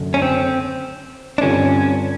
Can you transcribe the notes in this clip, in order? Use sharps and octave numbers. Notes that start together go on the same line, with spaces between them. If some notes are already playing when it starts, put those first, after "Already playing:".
Already playing: F#1 F#2 D3
C#4
C4
D4
G2 D3 G3 C4 C#4 F4